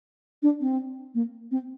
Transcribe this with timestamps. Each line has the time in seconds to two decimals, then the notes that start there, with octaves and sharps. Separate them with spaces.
0.43 D4
0.61 C4
1.15 A#3
1.51 C4